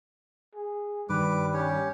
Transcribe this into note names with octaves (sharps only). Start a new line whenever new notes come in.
G#4
G2 D#3 G3 B4 D6
C#4 G4 C#5